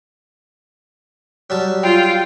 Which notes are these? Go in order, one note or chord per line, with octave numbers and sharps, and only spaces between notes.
F#3 G3 A5
F4 G5